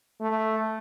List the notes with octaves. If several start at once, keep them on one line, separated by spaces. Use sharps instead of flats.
A3